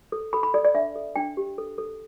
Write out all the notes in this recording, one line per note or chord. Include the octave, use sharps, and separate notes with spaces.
A4
A4 B5
B5
A4 D5
D5
D4 E5
A4
D4 G5
G4
A4
A4